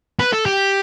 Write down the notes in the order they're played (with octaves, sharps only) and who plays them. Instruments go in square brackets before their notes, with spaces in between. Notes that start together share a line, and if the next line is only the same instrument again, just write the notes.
[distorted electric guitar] B4
A4
G4